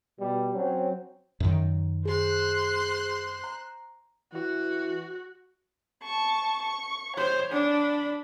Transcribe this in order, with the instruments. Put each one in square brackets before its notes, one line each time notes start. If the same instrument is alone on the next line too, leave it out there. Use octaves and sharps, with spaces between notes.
[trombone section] B2 G3
F#3 C4 C#4
[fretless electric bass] F#2 D#3
[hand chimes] G#4 [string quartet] C5 C6 F#6
[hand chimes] A#5
[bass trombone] E3 [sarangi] F#4
[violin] A5 C#6
C#6
[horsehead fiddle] C5 [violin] C#5
[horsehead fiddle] D4 [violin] B5